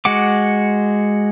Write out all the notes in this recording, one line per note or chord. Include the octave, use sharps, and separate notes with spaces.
G#3 F#4 F#5 D6